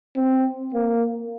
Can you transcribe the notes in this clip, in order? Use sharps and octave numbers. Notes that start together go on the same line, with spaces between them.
C4
A#3